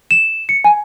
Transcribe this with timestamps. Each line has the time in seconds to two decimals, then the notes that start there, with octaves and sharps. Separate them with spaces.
0.11 E7
0.49 C#7
0.64 G#5